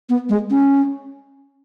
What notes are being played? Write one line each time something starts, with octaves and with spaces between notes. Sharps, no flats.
B3
G#3
C#4